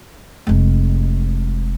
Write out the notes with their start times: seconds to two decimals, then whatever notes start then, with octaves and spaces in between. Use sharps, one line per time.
0.47 F1 G#3